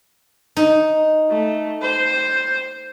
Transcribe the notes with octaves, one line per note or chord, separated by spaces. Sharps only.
D#4
A3
C5